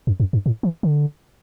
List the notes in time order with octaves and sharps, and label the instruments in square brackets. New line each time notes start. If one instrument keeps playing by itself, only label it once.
[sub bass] F#2
F#2
G2
A2
E3
D3